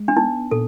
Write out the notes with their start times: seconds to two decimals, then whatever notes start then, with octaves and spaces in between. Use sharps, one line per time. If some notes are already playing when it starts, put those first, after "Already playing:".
Already playing: G#3
0.08 D4
0.17 B3 D#4
0.51 A#2 A4